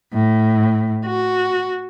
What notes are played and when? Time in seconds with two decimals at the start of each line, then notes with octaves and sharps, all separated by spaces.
0.13 A2
1.05 F#4